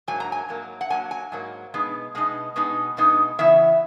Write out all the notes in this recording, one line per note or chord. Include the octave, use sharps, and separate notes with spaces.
G#2 F#3 A#3 G#5
A#5
G#5
G#2 F#3 A#3
F#5
G#2 F#3 A#3 G#5
G#5
G#2 F#3 A#3
B2 G#3 B3 D#4
B2 G#3 B3 D#4
B2 G#3 B3 D#4
B2 G#3 B3 D#4
C#3 E3 B3 E4 E5